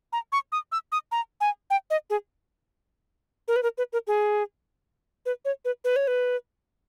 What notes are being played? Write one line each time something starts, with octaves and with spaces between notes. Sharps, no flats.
A#5
C#6
D#6
E6
D#6
A#5
G#5
G5
D#5
G#4
A#4
B4
A#4
B4
A#4
G#4
B4
C#5
B4
B4
C#5
B4